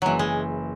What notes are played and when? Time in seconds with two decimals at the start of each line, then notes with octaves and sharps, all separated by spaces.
0.02 F#1 E3 F#3
0.19 G#3